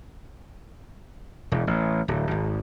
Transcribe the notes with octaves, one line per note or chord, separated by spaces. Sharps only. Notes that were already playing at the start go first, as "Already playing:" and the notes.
E1
A1
D1
G#1